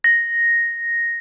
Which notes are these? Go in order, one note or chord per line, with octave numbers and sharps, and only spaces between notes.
A#6